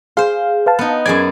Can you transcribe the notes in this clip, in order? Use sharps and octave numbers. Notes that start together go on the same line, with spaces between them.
G#4 C5 F5 C6
B4 F5 A5
B3 D#4
F#2 G#4 D5 G#6